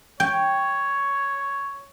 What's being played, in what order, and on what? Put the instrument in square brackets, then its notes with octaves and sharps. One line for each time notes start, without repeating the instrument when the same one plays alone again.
[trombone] C#5 [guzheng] G5